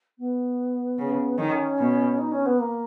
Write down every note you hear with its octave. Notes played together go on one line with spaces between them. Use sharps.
B3
C#3
D#3 C#4
B2
D#4
C#4
B3
A#3